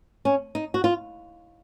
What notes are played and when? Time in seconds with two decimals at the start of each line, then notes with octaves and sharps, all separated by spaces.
0.25 C#4
0.55 D#4
0.74 F#4
0.84 F4